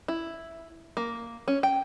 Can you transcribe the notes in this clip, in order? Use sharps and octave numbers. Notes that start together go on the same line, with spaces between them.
E4
A#3
C#4
G5